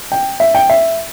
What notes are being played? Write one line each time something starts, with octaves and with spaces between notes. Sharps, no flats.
G5
E5
G5
E5